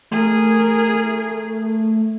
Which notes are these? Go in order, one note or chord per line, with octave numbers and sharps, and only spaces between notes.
A3 G#4 A#4